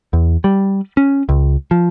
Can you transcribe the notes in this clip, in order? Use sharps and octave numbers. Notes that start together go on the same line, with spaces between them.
E2
G3
C#4
C#2
F3